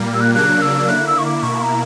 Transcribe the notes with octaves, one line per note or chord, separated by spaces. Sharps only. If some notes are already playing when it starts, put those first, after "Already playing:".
Already playing: A#2 G3 A#3
E6
F#6
C#3 F#3 A#3 D4 F#6
E6
D3 A#3 E4 F#6
E6
C#6
D6
B2 A#3 E4 C#6
A#5